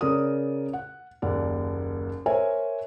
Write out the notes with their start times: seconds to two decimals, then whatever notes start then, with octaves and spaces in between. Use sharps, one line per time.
0.01 C#3 A#4 D5 D#6
0.73 F#5
1.22 F#1 D#2 D5 F#5
2.26 A#4 C5 C#5 E5 G#5